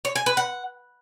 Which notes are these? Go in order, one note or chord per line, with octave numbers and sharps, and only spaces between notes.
C#5
G#5
B4
F#5